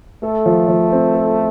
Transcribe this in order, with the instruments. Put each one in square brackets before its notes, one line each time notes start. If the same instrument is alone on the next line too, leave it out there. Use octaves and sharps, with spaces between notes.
[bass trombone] A3 [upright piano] A4
[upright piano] F3
F3
C4
A4